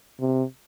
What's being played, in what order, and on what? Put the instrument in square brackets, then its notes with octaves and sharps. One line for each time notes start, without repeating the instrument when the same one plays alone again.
[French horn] C3